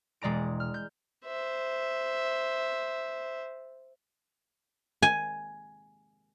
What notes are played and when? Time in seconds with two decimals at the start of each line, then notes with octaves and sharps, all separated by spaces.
0.22 E1 G#3 D5 A#5 D7
0.60 F6
0.74 G6
1.26 C5 E5
5.02 G#5